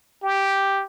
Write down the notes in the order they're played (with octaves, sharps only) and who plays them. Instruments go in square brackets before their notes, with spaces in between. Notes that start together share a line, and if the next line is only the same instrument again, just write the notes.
[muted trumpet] G4